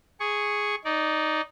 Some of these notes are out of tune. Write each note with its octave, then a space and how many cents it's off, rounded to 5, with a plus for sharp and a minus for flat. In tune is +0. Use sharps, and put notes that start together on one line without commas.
G#4 +0 C#6 +0
D#4 -5 D5 -20